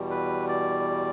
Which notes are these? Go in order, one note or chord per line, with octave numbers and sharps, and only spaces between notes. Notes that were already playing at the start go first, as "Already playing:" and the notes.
Already playing: E2 B2 G3
B4
D5